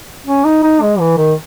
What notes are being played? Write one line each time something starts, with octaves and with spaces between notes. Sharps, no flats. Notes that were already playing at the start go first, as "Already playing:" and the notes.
C#4
D#4
D#4
G#3
E3
D#3